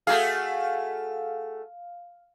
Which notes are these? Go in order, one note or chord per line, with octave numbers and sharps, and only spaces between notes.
A3 F#4 G#4 F5